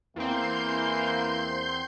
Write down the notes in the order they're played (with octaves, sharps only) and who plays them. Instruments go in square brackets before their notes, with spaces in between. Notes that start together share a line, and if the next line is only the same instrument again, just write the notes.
[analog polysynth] E2 C4 [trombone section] E3 A#3 [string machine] C6 G6